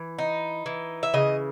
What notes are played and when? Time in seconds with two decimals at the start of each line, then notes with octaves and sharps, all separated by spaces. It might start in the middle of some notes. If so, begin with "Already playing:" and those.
Already playing: E3
0.18 D#4
0.66 E3
1.03 E5
1.14 C#3 D#5